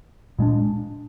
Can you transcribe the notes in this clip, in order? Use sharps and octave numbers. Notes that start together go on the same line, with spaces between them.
A#2 G#3 D4